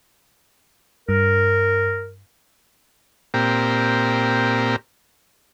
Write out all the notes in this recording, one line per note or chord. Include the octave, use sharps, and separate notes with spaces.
G2 A#4
A#2 C4 G4 A#4